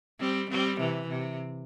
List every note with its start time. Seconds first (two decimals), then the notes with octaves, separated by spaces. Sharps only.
0.20 G3 C4
0.50 G3 C4
0.80 C3 E3
1.09 C3